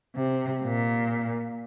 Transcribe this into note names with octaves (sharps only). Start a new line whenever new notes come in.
C3
A#2